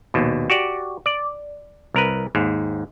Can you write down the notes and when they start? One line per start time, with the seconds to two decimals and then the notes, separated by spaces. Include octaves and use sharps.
0.14 A#1 D#2 B2
0.50 F#4 G4 D5
1.06 D5
1.94 C2 A#4 B4
2.35 D#2 G#2